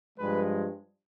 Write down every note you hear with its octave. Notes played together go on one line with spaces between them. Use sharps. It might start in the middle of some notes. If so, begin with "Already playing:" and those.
G2 F3 G#3 B4